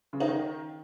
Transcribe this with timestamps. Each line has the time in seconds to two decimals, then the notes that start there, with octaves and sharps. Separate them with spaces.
0.13 C#3
0.20 D#4
0.28 D#3